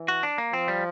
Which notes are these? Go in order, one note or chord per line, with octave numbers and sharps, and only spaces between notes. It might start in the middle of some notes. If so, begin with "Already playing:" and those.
Already playing: E3
F#4
D4
A#3
F3 C4
G3